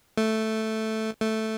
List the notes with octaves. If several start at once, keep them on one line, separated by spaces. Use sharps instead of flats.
A3
A3